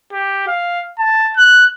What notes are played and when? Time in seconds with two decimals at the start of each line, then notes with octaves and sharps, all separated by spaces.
0.13 G4
0.47 F5
0.99 A5
1.37 F#6